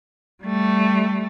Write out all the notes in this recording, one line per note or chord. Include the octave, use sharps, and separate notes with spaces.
G3 A3